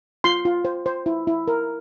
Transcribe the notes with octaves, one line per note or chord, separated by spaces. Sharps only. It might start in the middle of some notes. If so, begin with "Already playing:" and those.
F4 C6
F4
C5
C5
E4
E4
A#4